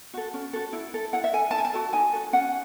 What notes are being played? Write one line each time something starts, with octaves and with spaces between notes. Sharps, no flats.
F#4 A4
C#4
F#4 A4
E4
A4
E4 F#5
E5
A4 G#5
D#4 A5
G#5
A5
F#4 A4
D#4 G#5
F#4 A4
C#4 F#5